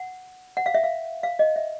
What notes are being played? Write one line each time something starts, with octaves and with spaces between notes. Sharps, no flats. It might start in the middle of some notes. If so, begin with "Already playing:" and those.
Already playing: F#5
F#5
F5
E5
F5
F5
D#5
E5